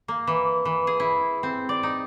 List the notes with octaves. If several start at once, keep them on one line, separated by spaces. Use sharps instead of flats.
A#3
E3
E3
G#4
E4
C4
D5
D#4